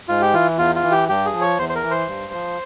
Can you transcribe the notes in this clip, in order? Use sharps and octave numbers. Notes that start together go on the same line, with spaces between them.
G#2 F4
G4
E3 F4
E2 F4
F4
E3
G4
G2 G4
G#4
F3
C#5
E2 C5
C5
A#4
E3
C5
G2
F3